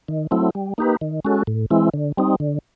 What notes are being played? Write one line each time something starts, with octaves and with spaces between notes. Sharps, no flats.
D#3
F#3 A3 C4 E4
G3
A#3 D#4 G4 B4
D#3
G#3 C#4 F#4 A4
A2
E3 G#3 C4 E4
D3
G3 C4 D#4
D3